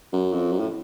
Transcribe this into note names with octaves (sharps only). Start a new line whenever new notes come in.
F#2
F2
F#2
A2